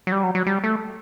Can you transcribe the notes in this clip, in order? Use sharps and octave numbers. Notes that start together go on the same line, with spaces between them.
F#3
G3
F#3
F#3
G3
A3